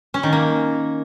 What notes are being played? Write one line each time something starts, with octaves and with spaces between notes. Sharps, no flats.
C#4
D#3
A#3